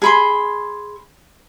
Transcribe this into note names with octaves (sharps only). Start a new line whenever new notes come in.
G#4 B5 C6